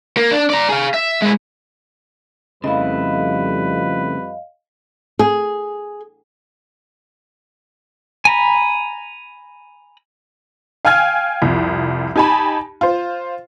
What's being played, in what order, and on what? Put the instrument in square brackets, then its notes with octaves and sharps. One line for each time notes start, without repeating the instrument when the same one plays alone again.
[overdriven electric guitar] A#3
D4
D5 A#5
G#4 F5
E5
G#3 E4
[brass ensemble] F2 G3 [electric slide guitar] C#3 A3 E4 [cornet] B4 [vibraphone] D#5 F5
[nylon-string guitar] G#4
[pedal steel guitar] G#5 A#5 B5
[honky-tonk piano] F5 G5 G#5 F6 G#6
C2 F2
D#4 G4 G#5 A5 B5
F4 C5